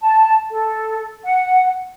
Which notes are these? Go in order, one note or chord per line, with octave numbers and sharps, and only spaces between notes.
A5
A4
F#5